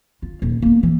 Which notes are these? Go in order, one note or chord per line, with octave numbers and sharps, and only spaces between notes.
F4
D#1
A#3 B3
E3